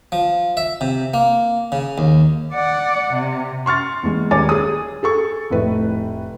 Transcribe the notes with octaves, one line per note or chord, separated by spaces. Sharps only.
F3
E5
C3
A#3
C#3
D#2
D5 F#5
C3
C6 C#6 F6 A6
E2 G#3
D#1 C#5 G#5 D6 A6
G#4 D#6
G#4 A4 C#6
F1 A2 B4